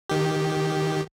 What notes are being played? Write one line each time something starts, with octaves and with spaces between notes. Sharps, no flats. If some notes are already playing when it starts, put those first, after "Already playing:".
D#3 G4